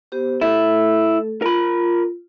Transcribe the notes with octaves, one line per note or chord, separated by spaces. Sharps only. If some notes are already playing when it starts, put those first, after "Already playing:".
B3 G4 C5
A3 E4 A4
F4 A#4 B5